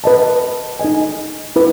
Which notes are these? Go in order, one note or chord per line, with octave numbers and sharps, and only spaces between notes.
B4 D#5 A5
D#4 A4 D#5 G#5
E4 B4